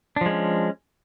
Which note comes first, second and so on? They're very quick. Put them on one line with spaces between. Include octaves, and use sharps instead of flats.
D4 F3 G#3 C#4